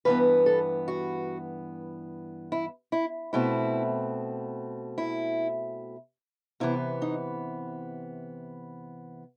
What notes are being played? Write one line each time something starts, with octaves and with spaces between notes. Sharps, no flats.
G2 E3 B3 B4
A4
F#4
E4
E4
B2 A3 C4 E4
E4
C3 E3 B3 E4
D#4